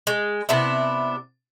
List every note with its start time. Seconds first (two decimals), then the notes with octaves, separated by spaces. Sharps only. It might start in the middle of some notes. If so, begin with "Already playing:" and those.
0.07 G#3
0.49 C3 B3 D4 E4